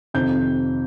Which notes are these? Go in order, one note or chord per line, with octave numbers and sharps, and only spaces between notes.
F2 C3 D#3 G6